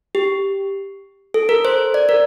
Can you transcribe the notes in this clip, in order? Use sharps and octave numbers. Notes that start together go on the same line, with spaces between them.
G4
A4
A#4
C5
D5
A#4